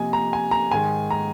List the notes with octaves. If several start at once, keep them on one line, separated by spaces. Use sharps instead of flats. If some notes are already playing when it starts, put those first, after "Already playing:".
Already playing: C3 F3 A#3 D#5 G#5
A#5
G#5
A#5
G#2 D#3 G#3 G#5
A#5